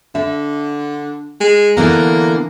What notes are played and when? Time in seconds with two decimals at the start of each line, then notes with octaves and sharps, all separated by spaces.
0.15 D3 E5
1.41 G#3
1.77 D3 E3 A#3 B3